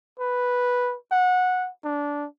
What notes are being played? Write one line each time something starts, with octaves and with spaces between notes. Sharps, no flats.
B4
F#5
D4